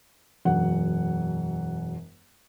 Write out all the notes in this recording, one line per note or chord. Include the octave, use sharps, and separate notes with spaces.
E1 F#2 F#5